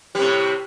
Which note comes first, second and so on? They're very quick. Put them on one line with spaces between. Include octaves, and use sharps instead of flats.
G3 C3 A2